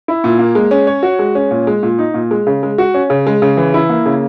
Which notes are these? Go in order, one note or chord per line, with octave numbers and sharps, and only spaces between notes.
E4
A#2
A#3
G#3
C#4
C#5
F#4
G#3
C#4
A#2
G#3
A#2
D#4
A#2
G#3
C#3
G#3
F#4
C#4
C#3
G#3
C#3
E3
E4
A#3
C#3